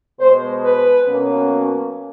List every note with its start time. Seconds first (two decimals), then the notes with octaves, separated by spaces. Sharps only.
0.19 B2 G#3 B3 C5
0.62 B4
1.06 B2 F#3 A#3 C#4